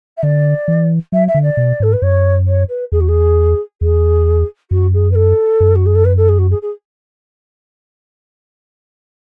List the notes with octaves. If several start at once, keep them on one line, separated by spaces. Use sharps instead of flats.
E5
D3 D5
E3
F#3 E5
E5
D3
D5
B2
G#2 A4
B4
F#2 C#5
C#5
B4
E2 G#4
F#4
G#4
E2 G#4
F#2 F#4
G#4
B4
A4
F#2
F#4
G#4
A4
B4
A4
G#4
F#4
G#4
G#4